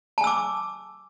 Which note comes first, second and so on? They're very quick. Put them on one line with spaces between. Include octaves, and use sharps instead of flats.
A5 G#5 E6 D6